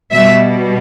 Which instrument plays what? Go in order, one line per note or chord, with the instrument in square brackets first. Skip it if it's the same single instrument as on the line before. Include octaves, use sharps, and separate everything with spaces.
[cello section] B2 G3 E5